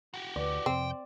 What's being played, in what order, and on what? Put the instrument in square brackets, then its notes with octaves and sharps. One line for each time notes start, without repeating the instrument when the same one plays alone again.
[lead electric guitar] F#4 G4
[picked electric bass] D2 [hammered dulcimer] D5
[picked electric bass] F2 C3 [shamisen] C4 [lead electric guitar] G5